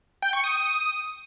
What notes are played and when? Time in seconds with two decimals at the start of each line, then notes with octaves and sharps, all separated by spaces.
0.22 G5
0.33 C#6
0.44 D#6